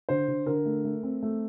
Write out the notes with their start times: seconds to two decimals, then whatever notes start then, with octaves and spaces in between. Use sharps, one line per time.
0.09 D3 C5
0.28 D3
0.46 D3 A#4
0.65 A3
0.85 A3
1.03 C4
1.23 A3